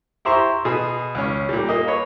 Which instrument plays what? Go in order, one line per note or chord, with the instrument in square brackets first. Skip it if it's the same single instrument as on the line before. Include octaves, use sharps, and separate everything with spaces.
[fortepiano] E4 G4 C5 A#5 C6 C#6
B2 G#4 B5
C#2 C#4
A#2 G3
A#3 D#5
A#3 B4 C#5